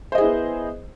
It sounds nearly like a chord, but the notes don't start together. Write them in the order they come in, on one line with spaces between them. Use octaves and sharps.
C5 D#5 G#4 E4 B3